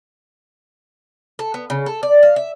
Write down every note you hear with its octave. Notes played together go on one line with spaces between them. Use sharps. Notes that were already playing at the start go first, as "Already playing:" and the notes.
A4
B3
C#3
A4
D5
F5
E5